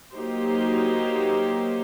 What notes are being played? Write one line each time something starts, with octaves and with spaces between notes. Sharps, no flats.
F#3 A#3 D#4 G4 C5